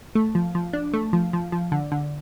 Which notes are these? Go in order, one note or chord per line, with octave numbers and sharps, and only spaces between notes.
A3
F3
F3
D4
A3
F3
F3
F3
D3
D3